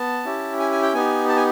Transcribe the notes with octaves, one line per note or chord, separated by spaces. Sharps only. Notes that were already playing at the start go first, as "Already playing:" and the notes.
Already playing: B3 A5
C#4 E4 G4
G#5
G#5
G5
B3 D#4 G4 G#5
A5
G#5